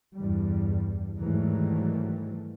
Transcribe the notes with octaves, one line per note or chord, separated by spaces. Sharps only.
E2 G2 G3
G#2 D#3 E3 F#3 G3 A3